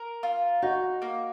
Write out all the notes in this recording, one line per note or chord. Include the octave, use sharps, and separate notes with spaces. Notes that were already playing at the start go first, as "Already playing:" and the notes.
Already playing: A#4
F4
D#4 F#4
A#3